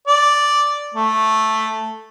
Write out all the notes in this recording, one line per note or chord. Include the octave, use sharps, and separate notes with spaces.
D5
A3